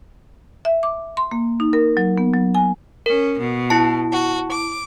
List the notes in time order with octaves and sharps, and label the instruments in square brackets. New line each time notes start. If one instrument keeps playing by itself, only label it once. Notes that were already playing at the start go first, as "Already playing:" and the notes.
[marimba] E5
D6
C6
A#3
D#4
A#4
F#3
B3
F#3
G#5
[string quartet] C#4 [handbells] A#4
[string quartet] B2
[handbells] E4 A5
[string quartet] F#4
D6